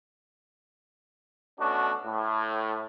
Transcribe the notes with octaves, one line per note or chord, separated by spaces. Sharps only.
B2 A3 C#4 D4 F#4
A2